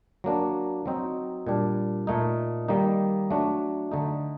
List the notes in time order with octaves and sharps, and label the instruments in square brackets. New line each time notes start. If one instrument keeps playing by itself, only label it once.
[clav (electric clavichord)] F#3 A#3 D4
F#3 C4 D#4
A#2 G3 D4
A#2 A3 D#4
D#3 G3 A#3 D#4
F#3 A3 D4
D3 A3 D#4